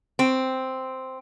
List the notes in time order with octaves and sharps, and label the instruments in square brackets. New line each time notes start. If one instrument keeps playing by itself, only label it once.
[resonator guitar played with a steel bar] C4